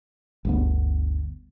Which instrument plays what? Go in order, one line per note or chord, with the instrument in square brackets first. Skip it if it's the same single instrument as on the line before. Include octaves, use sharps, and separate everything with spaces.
[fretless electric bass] G1 D2 B3